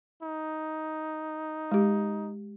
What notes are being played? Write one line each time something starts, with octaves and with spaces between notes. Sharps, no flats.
D#4
G#3 G4